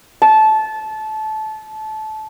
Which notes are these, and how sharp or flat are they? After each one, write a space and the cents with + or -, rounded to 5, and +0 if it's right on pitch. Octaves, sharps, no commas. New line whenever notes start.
A5 -20